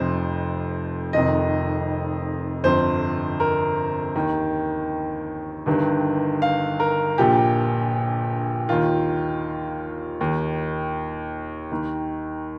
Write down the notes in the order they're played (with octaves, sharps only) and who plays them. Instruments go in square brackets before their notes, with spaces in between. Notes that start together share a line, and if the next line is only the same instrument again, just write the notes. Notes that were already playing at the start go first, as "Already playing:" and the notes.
Already playing: [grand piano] F1 F2 F3 C5
F1 F2 D#3 D#5
G1 F2 F3 C5
A#4
D#2 D#3
G1 G2 D#3
F5
A#4
A#1 A#2 F3 G4
D#2 D#3 F4
D#2 D#3
D#2 D#3